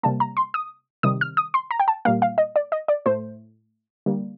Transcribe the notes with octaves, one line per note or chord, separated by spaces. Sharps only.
C3 G3 A#3 A5
A#5
C6
D#6
C3 D#3 G3 D#6
F6
D#6
C6
A#5
G5
A5
A#2 G3 A#3 F5
F5
D#5
D5
D#5
D5
A2 A3 C5
D3 G3 A#3